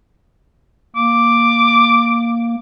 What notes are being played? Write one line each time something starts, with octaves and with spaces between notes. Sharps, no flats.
A#3 D6